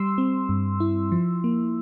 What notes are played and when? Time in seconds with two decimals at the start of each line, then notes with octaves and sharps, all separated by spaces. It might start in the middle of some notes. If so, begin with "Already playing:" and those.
Already playing: G3 C6 E6
0.18 C4
0.49 G2
0.80 E4
1.12 F3
1.44 A#3